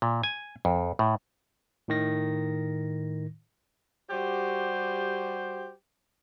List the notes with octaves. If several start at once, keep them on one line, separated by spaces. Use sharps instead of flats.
A#2
G#5
F2
A2
A2 D#3 A#6
G3 F#4 G4 C5